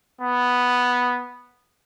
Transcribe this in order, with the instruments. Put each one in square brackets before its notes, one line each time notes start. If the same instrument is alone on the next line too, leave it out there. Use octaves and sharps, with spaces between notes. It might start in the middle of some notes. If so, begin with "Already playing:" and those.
[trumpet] B3